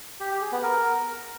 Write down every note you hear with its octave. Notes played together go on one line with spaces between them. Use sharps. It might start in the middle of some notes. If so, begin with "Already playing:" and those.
G4
G4
G#4
B3
A#4